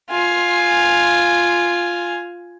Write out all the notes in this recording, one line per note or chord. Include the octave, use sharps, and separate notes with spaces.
F4 G#5